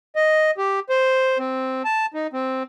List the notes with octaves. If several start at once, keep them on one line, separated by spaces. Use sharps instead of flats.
D#5
G4
C5
C4
A5
D#4
C4